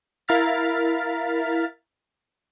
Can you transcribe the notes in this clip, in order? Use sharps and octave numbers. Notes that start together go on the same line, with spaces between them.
E4 A#4 F5 F6 A6 B6